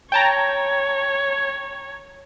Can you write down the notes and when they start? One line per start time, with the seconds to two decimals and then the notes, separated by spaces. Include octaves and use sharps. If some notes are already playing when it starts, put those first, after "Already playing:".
0.12 C#5 G5 A5 A#5